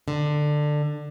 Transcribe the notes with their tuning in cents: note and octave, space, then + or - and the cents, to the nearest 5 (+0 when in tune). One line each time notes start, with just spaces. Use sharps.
D3 +15